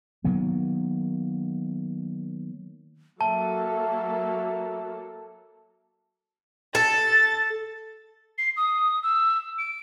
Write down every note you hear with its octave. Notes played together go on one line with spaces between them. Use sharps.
D#3 F#3 A#3 B3
F#3 A#3 A4 E5 A5
A4 A6
C7
D#6
E6
D7